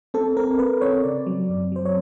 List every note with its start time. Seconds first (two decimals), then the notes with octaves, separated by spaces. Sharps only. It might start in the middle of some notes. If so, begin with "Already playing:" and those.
0.14 C4 A4
0.37 C4 A#4
0.59 C4 B4
0.81 C4 C#5
1.04 C#3 D5
1.27 F#3
1.49 F#2
1.72 F#3 C5
1.85 C#5